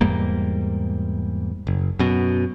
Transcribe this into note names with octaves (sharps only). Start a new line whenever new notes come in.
E2 G#2 G3 A#3
F#1
F#2 B2